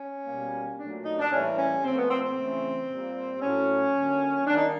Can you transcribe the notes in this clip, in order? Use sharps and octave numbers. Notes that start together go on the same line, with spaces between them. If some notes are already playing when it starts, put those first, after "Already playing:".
Already playing: C#4
B2 G3 A#3
A#2 F#3 A3 D4
D#4
D4
A2 E3 G3 A#3 C#4
C#4
A#2 F3 A3 C4
B3
C4
C4
C#3 E3 A3
A#2 G3 A#3
A2 F#3 A3 C#4
D3 F#3 A#3
D#3 G3 A#3 D4
D#4